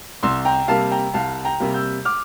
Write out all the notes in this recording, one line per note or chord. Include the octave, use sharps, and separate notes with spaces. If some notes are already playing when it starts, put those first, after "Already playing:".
C2 C6 E6
G5 A#5
C3 G3 A#3 F5 A5
G5 A#5
C2 F5 A5
G5 A#5
C3 G3 A#3
E6 G6
D6 F6